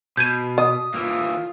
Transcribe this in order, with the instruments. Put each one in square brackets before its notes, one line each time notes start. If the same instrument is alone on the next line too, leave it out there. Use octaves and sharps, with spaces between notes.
[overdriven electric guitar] B2 [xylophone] G6 G#6 D#7
[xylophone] D#5 [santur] D#6
[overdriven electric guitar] E3 A#3 [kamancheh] F4